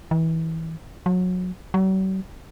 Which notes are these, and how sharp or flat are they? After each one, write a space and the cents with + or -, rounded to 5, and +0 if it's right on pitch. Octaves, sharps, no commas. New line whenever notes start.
E3 -25
F#3 -25
F#3 +45